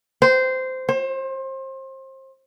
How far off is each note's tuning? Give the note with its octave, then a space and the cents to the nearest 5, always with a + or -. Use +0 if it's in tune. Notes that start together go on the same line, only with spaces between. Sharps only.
C5 -15
C5 +30